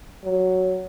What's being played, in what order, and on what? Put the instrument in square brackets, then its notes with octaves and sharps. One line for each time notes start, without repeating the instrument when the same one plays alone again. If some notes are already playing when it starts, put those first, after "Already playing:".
[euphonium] F#3